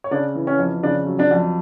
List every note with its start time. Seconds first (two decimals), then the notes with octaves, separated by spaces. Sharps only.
0.04 C#5
0.11 C#3 D4 D5
0.35 E3
0.47 C#4 C#5
0.59 F2
0.83 C#3 D4 D5
1.07 F#3
1.19 D4 D5
1.31 F2